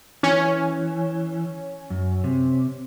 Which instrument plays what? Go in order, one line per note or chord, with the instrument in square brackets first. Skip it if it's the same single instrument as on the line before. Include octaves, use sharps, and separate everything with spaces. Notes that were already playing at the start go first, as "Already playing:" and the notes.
[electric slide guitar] E3 [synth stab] C#4
[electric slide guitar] F#2
C3